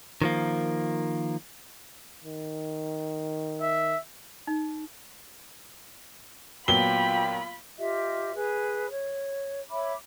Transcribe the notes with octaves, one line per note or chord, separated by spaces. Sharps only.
D#3 F3 A#3
D#3
E5
D#4
A#2 F#3 B3 F4 G5 B5 G7
F4 G4 D#5 E5
G#4 B4
C#5
C#5 E5 B5 D6